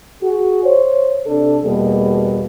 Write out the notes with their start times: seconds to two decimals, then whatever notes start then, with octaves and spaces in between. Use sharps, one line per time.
0.21 F#4 G#4
0.64 C5 C#5
1.26 C3 D4 A4
1.64 E2 B2 G3 A#3 G#4